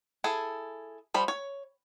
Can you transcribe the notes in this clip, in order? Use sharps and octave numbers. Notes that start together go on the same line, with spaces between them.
E4 G#4 A4
F3 G3 B5
C#5